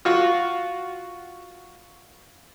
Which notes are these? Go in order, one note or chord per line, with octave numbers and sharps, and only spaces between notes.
F4 F#4 C#6